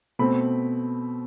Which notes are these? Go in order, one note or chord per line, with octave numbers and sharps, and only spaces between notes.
B2 A3 C4 B5